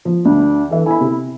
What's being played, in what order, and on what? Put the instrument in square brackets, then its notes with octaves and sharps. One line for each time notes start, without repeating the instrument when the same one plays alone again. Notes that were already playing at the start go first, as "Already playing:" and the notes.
[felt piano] F3
[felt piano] D2 [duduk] D4
[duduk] E3 [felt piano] A4 E5
[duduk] E4 [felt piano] G#5 B5
[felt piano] C3